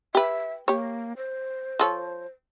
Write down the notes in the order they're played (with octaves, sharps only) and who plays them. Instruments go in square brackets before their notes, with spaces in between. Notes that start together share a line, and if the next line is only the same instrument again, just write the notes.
[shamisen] G4 B4 [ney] E5
[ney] A#3 [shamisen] G4 C#5
[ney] C5
[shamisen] F3 A4 C#5